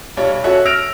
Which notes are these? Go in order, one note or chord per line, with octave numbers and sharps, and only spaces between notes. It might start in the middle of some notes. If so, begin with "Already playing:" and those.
B1 G3 C#5
C#4 F#4 A4 C#5 E5 F#5
E6 F6 A#6 D7 F7